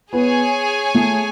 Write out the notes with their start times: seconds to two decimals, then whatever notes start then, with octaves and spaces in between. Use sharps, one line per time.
0.13 B3 G#4 C#5 G#5
0.95 A3